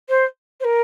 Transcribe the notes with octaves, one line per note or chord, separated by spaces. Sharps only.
C5
C5
A#4